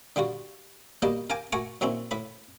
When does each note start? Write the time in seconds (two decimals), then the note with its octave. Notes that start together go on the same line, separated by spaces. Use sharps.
0.16 D3 G3 F4 F#4
1.02 F#3 G3 A#3 B3 G4 D#5
1.30 A#4 F5 G5 G#5 D6
1.52 A3 F#4 A#4 G#5 C#6 D6
1.81 A#2 F#3 C4 C#4 E4
2.11 A2 B4 B5